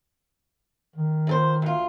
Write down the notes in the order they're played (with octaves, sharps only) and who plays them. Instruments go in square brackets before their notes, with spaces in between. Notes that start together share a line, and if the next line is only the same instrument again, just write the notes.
[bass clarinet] D#3
[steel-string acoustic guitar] F2 A4 C5
D2 F4